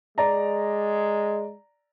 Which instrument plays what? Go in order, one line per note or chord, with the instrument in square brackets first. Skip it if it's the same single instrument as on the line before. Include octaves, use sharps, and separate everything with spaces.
[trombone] G#3 [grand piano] D5 A#5